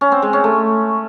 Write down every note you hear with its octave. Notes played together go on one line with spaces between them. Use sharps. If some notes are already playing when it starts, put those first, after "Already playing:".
C#4
C4
G#3
C#4
A3